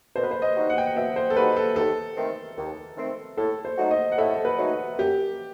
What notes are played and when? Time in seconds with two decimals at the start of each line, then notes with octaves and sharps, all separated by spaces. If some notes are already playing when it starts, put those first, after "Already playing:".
0.16 B2 C5
0.23 B4
0.31 C5
0.42 D#5
0.56 G3 D#4 F#4
0.70 F#5
0.78 G5
0.87 F#5
0.96 B2 E5
1.16 C5
1.30 A4
1.36 G3 D#4 F#4 B4
1.56 A4
1.76 D#2 A4
2.17 D#3 A3 C4
2.57 D#2
2.97 D#3 A3 C4
3.38 A2 A4
3.65 C5
3.78 F#3 A3 D#4 F#4
3.91 D#5
4.12 F#5
4.18 A2 E5
4.35 A4
4.45 B4
4.58 F#3 A3 D#4 F#4
4.98 F#2 G4